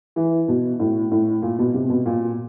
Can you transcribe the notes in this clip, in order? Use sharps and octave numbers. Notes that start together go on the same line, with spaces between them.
E3
B2
A2
A2
A#2
B2
C3
B2
A#2